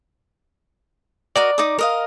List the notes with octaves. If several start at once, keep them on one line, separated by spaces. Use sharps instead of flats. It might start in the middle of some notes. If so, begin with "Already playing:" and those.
F#4 A#4 D5 D#5
D#4 D6 D#6
A#4 D#5 F5